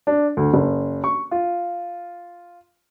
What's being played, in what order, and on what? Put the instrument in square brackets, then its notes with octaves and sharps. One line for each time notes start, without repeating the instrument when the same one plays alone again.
[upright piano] D4
D2
F#1
C#6
F4